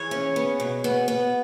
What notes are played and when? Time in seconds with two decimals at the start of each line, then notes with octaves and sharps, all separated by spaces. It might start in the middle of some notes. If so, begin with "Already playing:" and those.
Already playing: E3 G#4 C#5
0.11 C#4
0.36 B3
0.60 B2
0.84 B3
1.08 B3